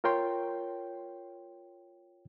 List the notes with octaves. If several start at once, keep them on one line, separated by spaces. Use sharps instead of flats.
F4 A#4 C#5 G5 C6